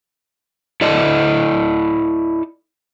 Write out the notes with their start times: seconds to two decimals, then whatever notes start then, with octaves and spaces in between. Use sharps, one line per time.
0.81 E4 A4 D5 D#5